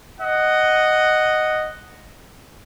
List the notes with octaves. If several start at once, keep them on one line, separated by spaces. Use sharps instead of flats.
D#5 F#5